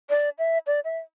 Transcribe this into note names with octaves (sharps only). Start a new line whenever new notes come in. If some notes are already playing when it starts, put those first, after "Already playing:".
D5
E5
D5
E5